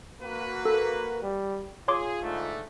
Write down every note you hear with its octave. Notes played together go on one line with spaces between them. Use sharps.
A#3 F#4 B4
A4 A#4
G3
F4 G#4 C#5 C6 D6
G#2 D3 A3